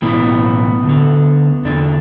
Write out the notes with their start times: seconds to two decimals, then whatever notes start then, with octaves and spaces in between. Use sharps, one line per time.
0.02 B1 A2 E3 B3
0.83 D2
0.89 D3
1.65 E2 D3 D4